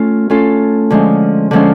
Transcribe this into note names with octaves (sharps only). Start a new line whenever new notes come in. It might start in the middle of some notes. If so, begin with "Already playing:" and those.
Already playing: A3 C#4 F4 A4
A3 C#4 F4 A4
D3 F3 G#3 C#4
D3 F3 G#3 C#4